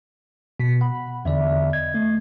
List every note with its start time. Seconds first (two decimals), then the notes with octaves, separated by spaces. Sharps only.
0.60 B2 B6
0.81 F#5 B5
1.25 E2 D3 D5 E5
1.73 D#5 G#6
1.94 A3